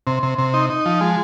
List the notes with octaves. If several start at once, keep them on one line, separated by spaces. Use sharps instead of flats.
C3
C3
C3
D#4
D#4
F3
G#3